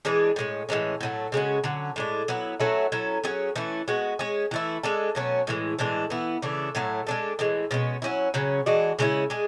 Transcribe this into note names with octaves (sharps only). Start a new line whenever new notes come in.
E3 G#3 D4 G#4
A2 G#3 C#4
A2 E3 G#3 C#4
A2 F#3 A3
C#3 G#3 C#4 F#4
D3 F#3 C#4
A2 G#3 D4
F#3 B3 E4
F#3 A3 C#4 E4
F#3 C#4 E4 A4
F#3 C#4 G#4
E3 A3 C#4 E4
G#3 B3 F#4
G#3 C#4 G#4
E3 A3 E4
G#3 D4 A4
B2 F#3 A3 C#4
A2 E3 G#3
A2 E3 G#3 D4
E3 B3 E4
C#3 E3 A3 D4
A2 F#3 A3
G#3 D4 A4
A2 E3 G#3
B2 G#3 C#4
F#3 C#4 E4
C#3 F#3 C#4
E3 G#3 D4 F#4
C#3 G#3 C#4 E4
G#3 D4 G#4